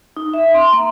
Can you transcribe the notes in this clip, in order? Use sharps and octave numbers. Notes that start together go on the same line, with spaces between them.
D#4
E5
C6
A#3